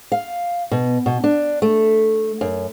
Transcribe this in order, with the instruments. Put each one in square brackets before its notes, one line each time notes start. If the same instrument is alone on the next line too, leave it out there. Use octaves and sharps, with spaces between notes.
[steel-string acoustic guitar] F5
B2
B2
D4
A3
F#2